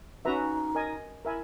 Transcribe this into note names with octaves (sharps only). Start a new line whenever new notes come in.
C#4 D#4 F#4 B4 E5 A#5
A#4 D#5 G#5
E4 A#4 E5 G#5 B5